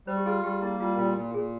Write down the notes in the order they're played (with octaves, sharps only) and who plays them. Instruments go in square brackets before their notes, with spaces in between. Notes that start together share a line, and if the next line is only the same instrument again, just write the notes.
[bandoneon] G3 [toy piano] C5
[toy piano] G4
[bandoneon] F4 [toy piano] G#4
[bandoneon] G3 [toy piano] G4
[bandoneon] A#3 [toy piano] E4
[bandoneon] G3 [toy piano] F4
[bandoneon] A#2 [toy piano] F4
[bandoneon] A#2
[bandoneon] A#2 [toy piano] G#4